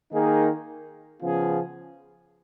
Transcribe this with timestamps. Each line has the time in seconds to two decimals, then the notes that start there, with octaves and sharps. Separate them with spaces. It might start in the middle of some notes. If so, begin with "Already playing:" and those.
0.11 D#3 A#3 D#4 G#4
1.21 C#3 F3 B3 F4 G#4